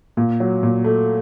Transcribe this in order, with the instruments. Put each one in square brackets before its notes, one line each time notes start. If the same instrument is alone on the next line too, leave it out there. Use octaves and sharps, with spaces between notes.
[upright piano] A#2
F#3
A#2
A3